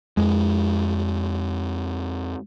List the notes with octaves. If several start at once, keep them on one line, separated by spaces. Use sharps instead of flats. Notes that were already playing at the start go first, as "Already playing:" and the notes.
F2 G#3